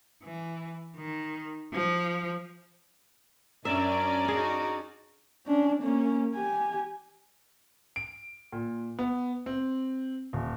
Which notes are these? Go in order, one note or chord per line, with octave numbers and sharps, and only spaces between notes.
E3
D#3
F3
F#2 F#3 C#4 D4 D5 E5 A#5
D#4 F#4 G#4
C#4 D4
A#3 C#4
G4 G#5
D7
A#2
B3
C4
D#1